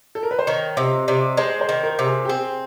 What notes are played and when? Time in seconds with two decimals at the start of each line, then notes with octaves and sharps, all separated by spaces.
0.15 A4
0.23 A#4
0.31 B4
0.39 C5
0.47 D#3 C#5
0.77 C3 D#5
1.08 C3 D5
1.37 G#3 C5
1.61 C5
1.69 D#3
1.84 A#4
1.99 C3
2.06 G#4
2.25 G4
2.29 C4 G#4